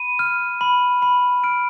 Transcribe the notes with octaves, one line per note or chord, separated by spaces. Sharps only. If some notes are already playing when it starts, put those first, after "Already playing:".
Already playing: B5 D#7
F6
B5
B5
F6 D7